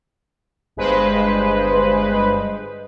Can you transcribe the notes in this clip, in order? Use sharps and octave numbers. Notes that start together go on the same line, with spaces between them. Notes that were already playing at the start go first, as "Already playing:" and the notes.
G1 G2 G#3 B4 C5